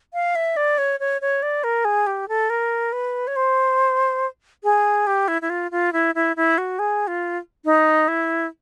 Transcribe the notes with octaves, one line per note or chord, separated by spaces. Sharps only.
F5
E5
D5
C#5
C#5
C#5
D5
A#4
G#4
G4
A4
A#4
B4
C#5
C5
G#4
G4
E4
E4
F4
F4
E4
E4
E4
F#4
G#4
F4
D#4
E4